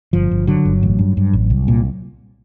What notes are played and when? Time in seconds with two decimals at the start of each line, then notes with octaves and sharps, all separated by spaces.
0.13 G1 F3
0.31 G1
0.47 D3 F#3
0.65 G1
0.83 A1
0.99 G2
1.17 G2
1.33 A1
1.50 C2
1.68 A#2